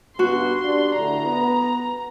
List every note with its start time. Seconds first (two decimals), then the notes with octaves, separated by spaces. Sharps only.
0.19 G2 C#3 B3 F#4 C6
0.63 D4 G4 D5
0.95 A2 D3 A#5
1.25 B3